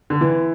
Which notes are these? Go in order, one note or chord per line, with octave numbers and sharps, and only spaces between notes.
D3
E3